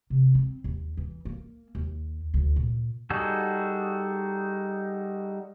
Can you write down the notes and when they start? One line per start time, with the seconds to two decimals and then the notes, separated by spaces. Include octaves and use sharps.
0.10 C3
0.35 C4
0.64 D#2
0.97 E3
1.25 A#3
1.75 D#2
2.34 D2
2.56 A#2
3.10 G3 D#4 F#4 G#4 A4